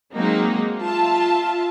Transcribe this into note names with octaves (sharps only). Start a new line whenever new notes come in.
F#3 G#3 A#3 C4 D#4
F4 E5 A5